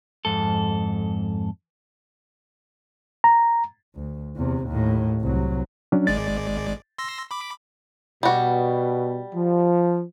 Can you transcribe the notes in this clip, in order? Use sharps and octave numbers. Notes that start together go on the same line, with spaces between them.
F2 G#2 A4
A#5
D2
E2 C3
D#2 A2
C2 F#3
F#3 C#4 D4
G#1 G#3 D5 A6
C6 E6 A#6
B5 D6
B2 G3 F#4
F3